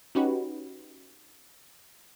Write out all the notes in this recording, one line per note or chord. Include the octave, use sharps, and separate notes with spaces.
C#4 D#4 F#4 G4 B4